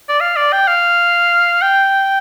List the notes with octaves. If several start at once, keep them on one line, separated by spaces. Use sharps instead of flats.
D5
F5
D5
G5
F5
G5